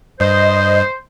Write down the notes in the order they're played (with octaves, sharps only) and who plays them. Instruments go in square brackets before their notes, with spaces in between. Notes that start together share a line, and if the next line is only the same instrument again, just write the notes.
[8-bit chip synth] G2 [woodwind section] C5 [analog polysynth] D#5